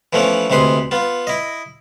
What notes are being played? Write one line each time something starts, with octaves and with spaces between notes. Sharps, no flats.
E3 F3 A3 B3 C#4
D2 C3 G#3 B4 C6 D#6
B3 F4
E4 D#5